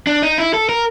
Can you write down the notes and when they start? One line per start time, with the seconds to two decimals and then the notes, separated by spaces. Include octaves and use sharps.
0.07 D4
0.23 D#4
0.38 E4
0.54 A4
0.69 A#4